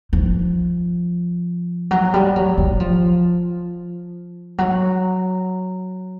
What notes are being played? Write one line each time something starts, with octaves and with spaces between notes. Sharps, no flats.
F3
F#3
G3
F#3
F#3
F3
F#3